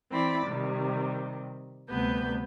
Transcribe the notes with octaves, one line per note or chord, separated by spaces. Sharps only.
E3 C4 E4 D5 B5
C3 D#3 G3
D2 C3 G3 B3 B4 G6